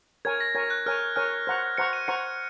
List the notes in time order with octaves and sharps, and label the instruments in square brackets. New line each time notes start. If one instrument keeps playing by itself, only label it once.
[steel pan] A#4 C#5 G#5 [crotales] G#6
[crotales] A#6
[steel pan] A#4 C#5 G#5 [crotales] G#6
[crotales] F#6
[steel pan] A#4 C#5 G#5 [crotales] F6
[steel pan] A#4 C#5 G#5 [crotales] F6
[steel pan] C5 F#5 A#5 C#6
[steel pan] C5 F#5 A#5 C#6 [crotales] C#7
[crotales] D#7
[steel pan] C5 F#5 A#5 C#6 [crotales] C#7